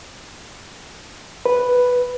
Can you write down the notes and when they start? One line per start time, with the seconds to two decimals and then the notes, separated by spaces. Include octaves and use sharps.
1.46 B4